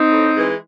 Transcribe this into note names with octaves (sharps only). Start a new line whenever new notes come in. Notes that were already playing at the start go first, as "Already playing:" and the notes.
Already playing: C4 D#4
A2
E3 G#3